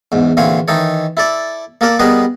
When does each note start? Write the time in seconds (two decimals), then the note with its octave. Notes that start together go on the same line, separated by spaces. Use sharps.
0.12 E2 G#2
0.37 A#1 D3 E3 C4 C#5 F5
0.68 D#3 E3 D#4 A4 C#5
1.17 E4 A4 D5
1.81 A#3 A4 A#4 D5
1.99 G3 B3 G#4 A#4 B4 D#5